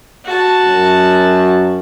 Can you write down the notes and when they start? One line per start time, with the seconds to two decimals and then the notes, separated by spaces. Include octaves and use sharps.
0.25 F#4 A5
0.65 F#2